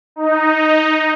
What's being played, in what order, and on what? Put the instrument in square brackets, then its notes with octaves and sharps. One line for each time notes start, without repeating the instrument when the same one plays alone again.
[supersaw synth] D#4